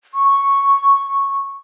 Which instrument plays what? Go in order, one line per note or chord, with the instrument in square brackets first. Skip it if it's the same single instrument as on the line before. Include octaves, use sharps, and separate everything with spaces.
[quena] C#6